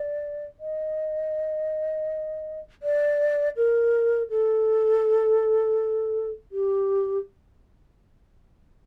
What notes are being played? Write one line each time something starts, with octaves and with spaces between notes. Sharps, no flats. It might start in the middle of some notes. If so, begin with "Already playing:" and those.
Already playing: D5
D#5
D5
A#4
A4
G4